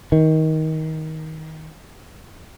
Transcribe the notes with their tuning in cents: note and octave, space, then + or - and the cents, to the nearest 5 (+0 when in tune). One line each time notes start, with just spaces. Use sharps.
D#3 +20